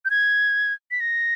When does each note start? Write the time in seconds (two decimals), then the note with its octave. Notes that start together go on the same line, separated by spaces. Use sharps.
0.05 G6
0.10 G#6
0.91 B6
1.00 A#6